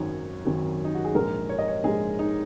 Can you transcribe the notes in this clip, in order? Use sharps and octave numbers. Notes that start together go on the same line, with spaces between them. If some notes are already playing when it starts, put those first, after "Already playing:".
Already playing: G#1 F#2 D#3 F#3 C#5
G#1 F#2 D#3 F#3
D#4
F#4
G#4
A#1 G#2 G#3 A#4
C#5
D#5
C#5
A#1 G#2 G#3 G#4
D#4